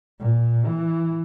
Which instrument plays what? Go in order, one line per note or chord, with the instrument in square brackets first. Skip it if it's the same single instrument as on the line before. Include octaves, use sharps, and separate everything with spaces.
[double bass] A#2
E3